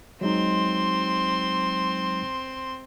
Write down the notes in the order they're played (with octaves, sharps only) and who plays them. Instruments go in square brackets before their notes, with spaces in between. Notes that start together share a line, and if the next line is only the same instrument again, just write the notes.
[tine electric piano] F#3 G#3 D#4 [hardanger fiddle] C4 C6